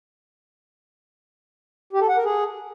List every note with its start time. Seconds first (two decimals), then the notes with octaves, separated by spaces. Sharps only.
1.93 G4
2.01 A4
2.09 F#5
2.17 A#4
2.25 G#4